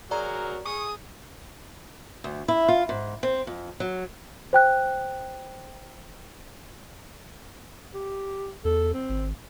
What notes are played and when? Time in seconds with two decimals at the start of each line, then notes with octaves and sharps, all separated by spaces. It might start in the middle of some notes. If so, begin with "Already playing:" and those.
0.11 F#3 F#4 G#4 A#4 D5 A#5
0.66 G#4 C#6 D#6
2.24 D2
2.48 E4
2.68 F4
2.89 G#2
3.23 C4
3.47 F2
3.80 F#3
4.53 C5 G5 F#6
7.94 G4
8.65 E2 A4
8.94 C4
9.10 G#1